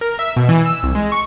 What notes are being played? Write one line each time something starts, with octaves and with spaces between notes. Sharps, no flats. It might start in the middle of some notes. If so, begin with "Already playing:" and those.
A#4
E5
B2
E3
E6
C2
G#3
C#6